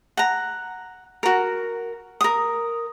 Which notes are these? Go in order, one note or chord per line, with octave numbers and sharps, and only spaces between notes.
F#5 A#5
F#4 A#4
A#4 D#6